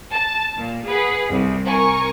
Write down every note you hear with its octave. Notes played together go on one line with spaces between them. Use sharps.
A5
A#2
G#4 B4 F#5
C2
A#4 G#5 C#6